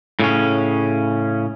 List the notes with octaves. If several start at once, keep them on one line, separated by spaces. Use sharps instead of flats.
A2 C#3 C#4